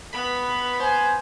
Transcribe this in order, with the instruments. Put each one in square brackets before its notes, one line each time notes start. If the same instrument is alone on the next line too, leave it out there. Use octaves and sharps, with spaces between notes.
[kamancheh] B3 B4 [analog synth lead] B5
[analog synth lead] C5 [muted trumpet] G#5